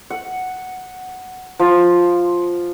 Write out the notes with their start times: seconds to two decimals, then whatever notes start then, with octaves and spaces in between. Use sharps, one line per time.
0.10 F#5
1.59 F3